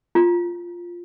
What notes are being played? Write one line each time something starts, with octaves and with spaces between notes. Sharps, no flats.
F4